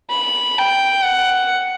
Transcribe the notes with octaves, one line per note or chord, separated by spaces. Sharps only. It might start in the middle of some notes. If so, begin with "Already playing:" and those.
B5
G5
F#5